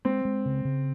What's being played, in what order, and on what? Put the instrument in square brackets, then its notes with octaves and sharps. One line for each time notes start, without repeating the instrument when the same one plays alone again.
[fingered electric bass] G#3 [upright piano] C4
[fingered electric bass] G#3
C#3
C#3